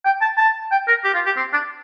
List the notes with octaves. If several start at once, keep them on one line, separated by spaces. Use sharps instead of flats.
G5
A5
A5
G5
A#4
G4
F4
G4
C4
D4